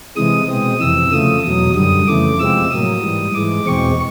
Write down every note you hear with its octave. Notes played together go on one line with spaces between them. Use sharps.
C3 E3 G#3 D#6
B2 G#3 C4 D#6
F2 C3 E3 E6
C#3 F3 A3 D#6
E2 B2 F#3 D#6
F#2 D3 G3 D#6
F2 C#3 E3 A3 D6
C3 F3 G#3 C4 E6
A2 F#3 A#3 D#6
G#2 E3 G3
G#2 E3 G#3 D6
E2 B2 G#3 C4 C#6